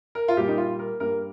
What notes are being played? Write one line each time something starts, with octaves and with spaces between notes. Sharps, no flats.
A#4
F4
A#2 G3 A#3 G4
D#4
F4
A#4
G2 G3 A#3 A#4